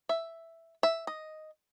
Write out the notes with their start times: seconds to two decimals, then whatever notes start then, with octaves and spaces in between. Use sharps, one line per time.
0.09 E5
0.83 E5
1.07 D#5